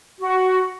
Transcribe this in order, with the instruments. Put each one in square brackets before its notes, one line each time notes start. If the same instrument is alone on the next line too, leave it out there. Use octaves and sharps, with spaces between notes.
[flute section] F#4